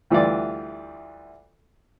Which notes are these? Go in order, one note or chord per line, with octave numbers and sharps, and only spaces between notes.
D2 E3 G3 F4 D5